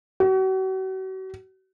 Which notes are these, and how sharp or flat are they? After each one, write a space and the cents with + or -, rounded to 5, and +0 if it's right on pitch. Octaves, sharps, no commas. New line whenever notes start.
F#4 +40